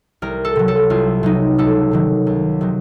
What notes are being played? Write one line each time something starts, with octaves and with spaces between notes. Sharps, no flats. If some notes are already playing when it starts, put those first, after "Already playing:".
C2 A#4
A4
C3 F#3
A4
C2 F4
C3 F#3 D#4
C#2 A4
C3 D#3 F#3
C#2
C3 D#3 F#3